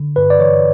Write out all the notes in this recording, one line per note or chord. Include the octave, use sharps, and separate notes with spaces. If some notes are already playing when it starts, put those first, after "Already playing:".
Already playing: D3
G2 B4
D5
E3 C#5